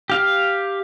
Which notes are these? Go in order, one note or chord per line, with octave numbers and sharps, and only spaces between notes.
G4 F5